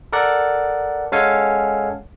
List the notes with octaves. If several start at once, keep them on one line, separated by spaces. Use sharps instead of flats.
A4 A#4 D5 F#5
G#3 C#4 A4 F5 F#5 G#5